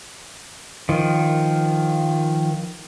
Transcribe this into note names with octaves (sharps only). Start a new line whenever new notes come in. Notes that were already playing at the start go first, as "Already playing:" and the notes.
D#3 F3